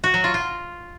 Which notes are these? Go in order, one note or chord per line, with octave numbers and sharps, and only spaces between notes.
F#4
F#3
F4
F4